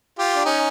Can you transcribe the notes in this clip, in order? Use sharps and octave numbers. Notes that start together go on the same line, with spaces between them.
F4 G4
D4
C#4 D#4